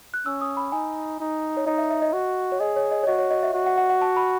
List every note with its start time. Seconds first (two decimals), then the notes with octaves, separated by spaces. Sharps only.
0.14 F#6
0.26 C#4 E6
0.41 D#6
0.57 B5
0.72 D#4 G#5
1.20 D#4
1.57 C#5
1.66 D#4 D#5
1.78 E5
1.91 E5
2.02 D#5
2.13 F#4
2.52 C#5
2.60 G#4 D#5
2.76 C#5
2.91 D#5
3.03 C#5
3.07 F#4 D#5
3.19 C#5
3.31 D#5
3.43 E5
3.54 F#4
3.66 F#5
3.78 F#5
3.90 F#5
4.02 A5
4.17 B5